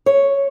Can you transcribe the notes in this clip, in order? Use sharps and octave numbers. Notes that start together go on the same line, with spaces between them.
C#5